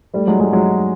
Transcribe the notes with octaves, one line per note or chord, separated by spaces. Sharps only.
G3 A3
F#3 G#3
F#3 G#3
F#3 G#3